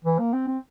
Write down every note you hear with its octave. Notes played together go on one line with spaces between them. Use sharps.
E3
A#3
C4
C4